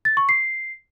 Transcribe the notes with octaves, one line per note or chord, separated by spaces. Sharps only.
A6
C#6
C7